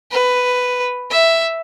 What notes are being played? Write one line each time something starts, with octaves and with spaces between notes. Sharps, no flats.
B4
E5